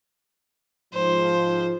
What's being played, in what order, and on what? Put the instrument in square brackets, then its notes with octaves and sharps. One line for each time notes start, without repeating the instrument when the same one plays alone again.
[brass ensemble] G#2 F3 [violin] C5